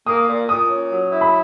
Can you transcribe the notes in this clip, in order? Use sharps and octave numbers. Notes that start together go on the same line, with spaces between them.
A#3 D#6
A#2
A#2 D#6
C#4
F#3
E4
B5